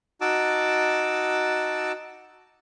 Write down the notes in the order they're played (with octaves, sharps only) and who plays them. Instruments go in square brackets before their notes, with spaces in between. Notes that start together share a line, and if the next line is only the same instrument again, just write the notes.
[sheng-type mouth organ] D#4 F#4 A5 D6 E6